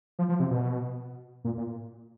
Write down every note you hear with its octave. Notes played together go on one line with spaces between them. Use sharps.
F3
F3
C3
B2
A#2
A#2